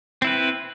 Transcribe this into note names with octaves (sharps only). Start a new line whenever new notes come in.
C4 E4 B4